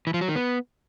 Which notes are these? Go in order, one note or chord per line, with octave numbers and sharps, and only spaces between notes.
E3
F3
F#3
D#3
B3